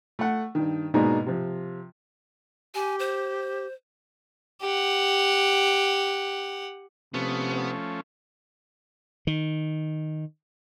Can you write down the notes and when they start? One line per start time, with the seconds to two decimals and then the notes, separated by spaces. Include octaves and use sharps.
0.19 A3 F#5
0.55 G2 D#3
0.94 G#2 B2 G#3 A#3 D4 D#4
1.26 C3 F3
2.75 G4 G#5
2.99 C5
4.61 G4 F#5
7.14 C3 F3 A3 B3 C#4
9.27 D#3